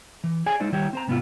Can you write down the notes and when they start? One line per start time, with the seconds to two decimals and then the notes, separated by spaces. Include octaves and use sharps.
0.24 E3
0.46 G#4 C#5 D5 G#5
0.60 G#3 D#4 E4 C5 D5
0.73 D#3 G3 E4 G4 C#5
0.93 C4 C5 A#5
1.08 G#2 C3 B3 C4 E4 F4